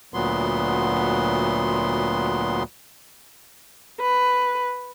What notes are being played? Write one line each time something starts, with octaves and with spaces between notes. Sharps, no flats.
D2 A#2 F#3 B3 C6
B4